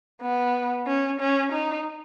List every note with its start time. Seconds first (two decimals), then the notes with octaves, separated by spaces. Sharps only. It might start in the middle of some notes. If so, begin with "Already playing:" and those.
0.22 B3
0.87 C#4
1.20 C#4
1.52 D#4